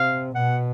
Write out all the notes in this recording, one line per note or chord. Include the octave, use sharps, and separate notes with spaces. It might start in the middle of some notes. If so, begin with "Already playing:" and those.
Already playing: C3 F5
B2 F#5